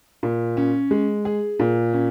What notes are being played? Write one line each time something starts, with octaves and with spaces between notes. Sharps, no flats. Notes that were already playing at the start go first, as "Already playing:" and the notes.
A#2
C#4
G#3
G#4
A#2
C#4